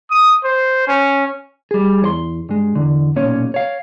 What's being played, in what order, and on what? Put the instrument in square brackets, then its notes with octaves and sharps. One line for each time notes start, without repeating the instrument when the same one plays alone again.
[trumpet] D#6
C5
C#4
[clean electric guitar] G3 G#4
E2 C#5 C6
G2 G#3
E2 D3
B1 A#2 C#4 C#5
C#5 F5